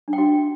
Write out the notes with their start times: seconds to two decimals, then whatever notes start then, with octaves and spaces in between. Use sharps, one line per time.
0.08 D4
0.13 G5
0.18 F#4